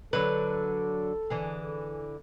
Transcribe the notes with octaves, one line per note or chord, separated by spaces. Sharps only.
D3 F#3 A4 B4
D3 E3 G#4